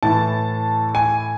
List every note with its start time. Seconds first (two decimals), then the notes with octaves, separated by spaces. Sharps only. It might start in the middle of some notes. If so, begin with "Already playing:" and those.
0.03 A2 E3 A5
0.95 G#5